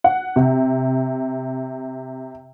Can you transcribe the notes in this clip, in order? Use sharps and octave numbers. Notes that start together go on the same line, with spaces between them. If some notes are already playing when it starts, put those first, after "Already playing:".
F#5
C3